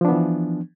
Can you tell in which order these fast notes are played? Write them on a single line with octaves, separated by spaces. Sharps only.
F3 D4 B3 E3